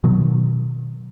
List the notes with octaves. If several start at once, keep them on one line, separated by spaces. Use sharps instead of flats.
B2 D#3 F#3